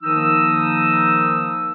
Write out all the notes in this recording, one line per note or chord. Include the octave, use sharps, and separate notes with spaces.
D#3 F3 A#3 D#4 D#6 E6